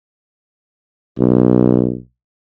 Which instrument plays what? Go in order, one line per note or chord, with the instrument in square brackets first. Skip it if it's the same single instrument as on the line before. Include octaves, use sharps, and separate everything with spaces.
[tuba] B1